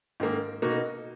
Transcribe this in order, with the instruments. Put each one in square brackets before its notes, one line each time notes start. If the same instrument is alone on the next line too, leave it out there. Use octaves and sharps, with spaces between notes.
[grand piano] G#2 D#3 A#3
B2 A#3 D#4 F#4